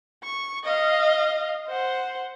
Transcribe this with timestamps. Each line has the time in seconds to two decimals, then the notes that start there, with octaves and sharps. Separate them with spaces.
0.23 C#6
0.64 D#5 F5
1.68 C5 F#5